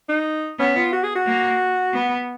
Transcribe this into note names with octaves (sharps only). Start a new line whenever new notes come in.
D#4
B3 C#4
F4
F#4
G#4
F#4
A#3
B3